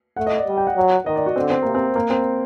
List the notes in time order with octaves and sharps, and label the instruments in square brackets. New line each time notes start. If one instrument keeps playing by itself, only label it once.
[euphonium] A3 [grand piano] F#5
[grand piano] D#5
D5
[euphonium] G3
[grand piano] G5
F#5
[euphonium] F#3
[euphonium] D#3 [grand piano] D#5
[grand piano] D5
F#4
[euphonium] D3 [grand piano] C4
[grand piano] C4
[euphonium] C3 [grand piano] A#3
[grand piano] C4
A#3
C4